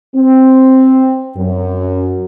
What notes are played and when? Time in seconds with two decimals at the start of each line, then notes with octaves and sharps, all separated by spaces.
0.16 C4
1.37 F#2